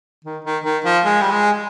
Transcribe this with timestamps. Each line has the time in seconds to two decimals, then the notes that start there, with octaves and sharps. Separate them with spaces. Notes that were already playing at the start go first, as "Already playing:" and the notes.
0.25 D#3
0.45 D#3
0.64 D#3
0.85 F3
1.05 G#3
1.22 G3
1.32 G#3